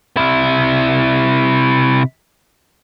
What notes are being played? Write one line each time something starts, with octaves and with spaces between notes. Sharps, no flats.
C3 E4